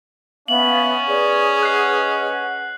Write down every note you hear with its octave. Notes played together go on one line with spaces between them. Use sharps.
B3 C#4 E5 F5 F#7
G#4 B4 C#5 D5
B4 D#5 F#5 F#6 C7